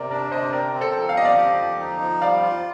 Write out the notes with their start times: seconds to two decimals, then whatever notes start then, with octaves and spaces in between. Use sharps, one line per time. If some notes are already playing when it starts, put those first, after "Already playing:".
Already playing: C3 G4 A#4 D5
0.11 D4 A#4 D5
0.32 C3 C5 D#5
0.53 C4 A#4 D5
0.75 C4
0.81 A4 C5
0.96 F3
1.09 F5
1.17 G4 D#5
1.25 D5 F5
1.37 G4
1.59 F3
1.80 D#4
2.01 F3
2.22 G3 D5 F5
2.42 F4